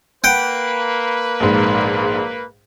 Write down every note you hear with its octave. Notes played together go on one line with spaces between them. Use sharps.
A#3 B4 F#5 G5
A#1 G#2